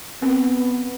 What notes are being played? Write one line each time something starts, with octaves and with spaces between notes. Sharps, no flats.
B3 C4